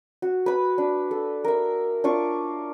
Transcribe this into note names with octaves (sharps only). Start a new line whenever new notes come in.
F#4
B4 B5
D4
A4
A#4 E5
D4 F4 C#6 D6